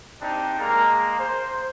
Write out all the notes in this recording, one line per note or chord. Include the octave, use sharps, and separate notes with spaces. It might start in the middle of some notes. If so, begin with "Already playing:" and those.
C4 D4 D#4 G4
G#3 A#3 A#5
C5